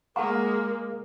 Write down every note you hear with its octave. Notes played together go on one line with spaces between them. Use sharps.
G#3 A#3 A#4 F5 F#5 A#5 C#6